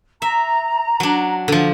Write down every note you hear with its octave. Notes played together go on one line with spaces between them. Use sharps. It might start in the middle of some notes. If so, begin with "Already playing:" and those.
E5 A#5
F#3 D4
D3 F3